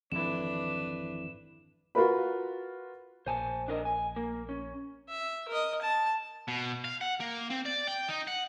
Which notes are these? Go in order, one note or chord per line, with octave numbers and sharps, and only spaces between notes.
G#1 F2 E3 D4 E4 B4 E7
F4 F#4 A#4 B4 B5
A#1 C5 G#5 A5
D4 A#4 D#5
G#5
A#3
C#4
E5
A#4 D#5
A5
B2
F5
F#5
A#3
C4
D5
G5
D#4
F#5